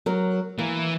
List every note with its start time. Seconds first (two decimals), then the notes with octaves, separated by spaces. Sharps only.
0.06 F#3 A#4
0.59 E3 A#3